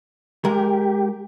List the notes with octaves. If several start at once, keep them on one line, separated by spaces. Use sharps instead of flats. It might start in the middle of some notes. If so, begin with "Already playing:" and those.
G#3 G4 A#4